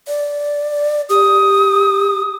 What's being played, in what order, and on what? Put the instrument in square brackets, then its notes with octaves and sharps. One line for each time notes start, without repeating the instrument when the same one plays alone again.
[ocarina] D5
[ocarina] G4 [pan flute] D#6